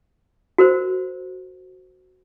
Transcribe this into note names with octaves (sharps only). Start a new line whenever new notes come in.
F#4 A#4 C5